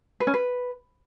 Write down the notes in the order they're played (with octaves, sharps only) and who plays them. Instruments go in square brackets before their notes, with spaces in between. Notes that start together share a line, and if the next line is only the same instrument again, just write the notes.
[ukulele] B4
C#4
B4